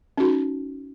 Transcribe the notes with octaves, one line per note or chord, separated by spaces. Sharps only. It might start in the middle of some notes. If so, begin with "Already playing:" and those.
C#4 D#4 F#4